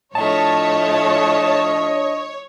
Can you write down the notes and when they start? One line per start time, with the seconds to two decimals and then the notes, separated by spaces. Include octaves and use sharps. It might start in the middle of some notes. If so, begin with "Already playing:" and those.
0.15 A2 F3 A3 D4 C#5 D#5 A5